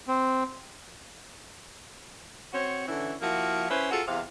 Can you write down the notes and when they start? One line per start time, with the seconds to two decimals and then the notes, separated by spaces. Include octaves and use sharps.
0.08 C4
2.53 C4 F#4 C5 C#5
2.88 D3 E3 C#4 E4
3.21 F3 A#3 E4 F#4
3.69 C#4 E4 B4 C5
3.90 F4 F#4 G#4 A4
4.07 E2 C3 F5